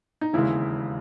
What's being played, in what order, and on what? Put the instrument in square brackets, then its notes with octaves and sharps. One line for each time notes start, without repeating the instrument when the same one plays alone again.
[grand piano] D#4
E1 D#2 C#3 E3 G#3 E4